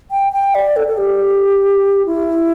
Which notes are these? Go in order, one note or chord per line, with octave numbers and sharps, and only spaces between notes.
G5
G5
D5
A4
A4
G4
E4